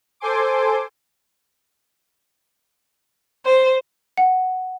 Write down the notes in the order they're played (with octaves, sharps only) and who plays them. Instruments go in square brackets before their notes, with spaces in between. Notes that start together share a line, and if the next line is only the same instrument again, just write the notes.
[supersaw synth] A4 C5 G#5 C6 D6
[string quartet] C5
[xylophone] F#5